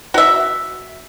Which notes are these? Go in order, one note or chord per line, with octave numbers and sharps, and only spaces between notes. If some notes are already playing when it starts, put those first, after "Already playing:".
F#4 E5